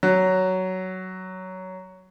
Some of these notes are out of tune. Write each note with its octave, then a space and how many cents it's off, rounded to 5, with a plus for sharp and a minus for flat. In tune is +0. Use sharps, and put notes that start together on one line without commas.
F#3 +10